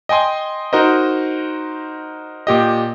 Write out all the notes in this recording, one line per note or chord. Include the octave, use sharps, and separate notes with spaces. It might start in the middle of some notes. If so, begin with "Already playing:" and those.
D#5 G5 G#5 C6 D#6
D#4 F#4 A#4 C5 D#5
A#2 G4 D#5